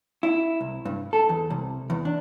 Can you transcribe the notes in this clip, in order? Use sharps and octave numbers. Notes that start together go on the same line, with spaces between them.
E4
C2
G2
A4
E2
C2
E2
D4